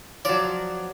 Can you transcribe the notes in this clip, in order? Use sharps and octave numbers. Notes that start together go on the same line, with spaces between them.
F3 F#3 D5